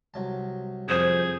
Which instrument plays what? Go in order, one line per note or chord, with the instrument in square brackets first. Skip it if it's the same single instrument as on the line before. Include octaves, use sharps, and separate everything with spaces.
[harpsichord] C2 F#3 A5
[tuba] F2 [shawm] G#4 [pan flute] C5